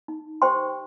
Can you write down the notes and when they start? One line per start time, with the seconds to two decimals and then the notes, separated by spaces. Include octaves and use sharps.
0.08 D#4
0.42 G4 C5 G5 C6